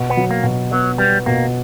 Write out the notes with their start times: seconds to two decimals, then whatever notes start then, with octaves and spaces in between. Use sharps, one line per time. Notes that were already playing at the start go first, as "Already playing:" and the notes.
Already playing: B2
0.10 B3
0.17 F#3
0.31 A#3
0.43 B2
0.71 F#3 B3
0.98 G3 B3
1.26 B2 A#3